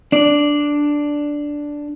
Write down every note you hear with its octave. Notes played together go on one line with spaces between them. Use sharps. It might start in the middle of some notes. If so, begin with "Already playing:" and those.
D4 D5